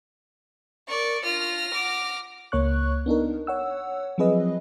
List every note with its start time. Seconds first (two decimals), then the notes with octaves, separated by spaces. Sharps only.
0.89 A#4 D5 C#6
1.24 D4 F4 F6 A#6
1.73 F#5 D6
2.52 C#2 A#3 C#5 C#6 F#6
3.06 B3 D4 D#4 A#4
3.47 C#5 F#5 E6
4.18 F3 F#3 C4 G#4 B4 D#5